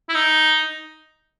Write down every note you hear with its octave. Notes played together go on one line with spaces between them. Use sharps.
E4
D#4